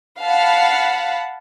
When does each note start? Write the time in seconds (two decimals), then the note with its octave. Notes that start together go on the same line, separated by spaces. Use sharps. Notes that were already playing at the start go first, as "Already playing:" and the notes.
0.21 F5 F#5 A5 B5